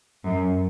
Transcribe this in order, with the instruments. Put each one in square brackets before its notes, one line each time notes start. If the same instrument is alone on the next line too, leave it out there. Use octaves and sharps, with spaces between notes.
[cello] F#2